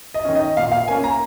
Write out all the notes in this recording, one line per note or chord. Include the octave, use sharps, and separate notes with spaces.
D#5
D#3 C#4
D#5
A#2 F5
F5
A#3 C#4 G#5
A#5